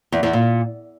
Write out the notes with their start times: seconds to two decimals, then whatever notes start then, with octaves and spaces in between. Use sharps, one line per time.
0.12 E2
0.23 E2
0.33 A#2